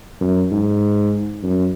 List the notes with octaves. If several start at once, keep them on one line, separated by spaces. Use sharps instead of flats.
F#2
G#2
F#2